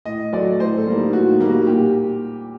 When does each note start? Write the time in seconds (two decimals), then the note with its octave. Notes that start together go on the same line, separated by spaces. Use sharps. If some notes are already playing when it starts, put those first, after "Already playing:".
0.05 A2 D#5
0.33 F#3 A3 D5
0.59 A2 C5
0.77 A4
0.87 G3 A#3
0.95 D#4
1.13 A2 F#4
1.31 D#4
1.40 G3 A#3
1.49 F#4
1.67 A#2 G4